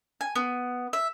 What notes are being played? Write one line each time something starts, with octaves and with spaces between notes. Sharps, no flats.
G#5
B3
E5